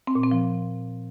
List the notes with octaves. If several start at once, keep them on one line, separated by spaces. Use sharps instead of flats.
C4
A#2
C4
F3